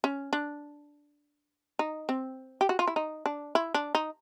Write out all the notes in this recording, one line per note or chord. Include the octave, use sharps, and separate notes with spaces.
C#4
D4
D#4
C4
G4
F#4
F4
E4
D#4
D4
E4
D4
D#4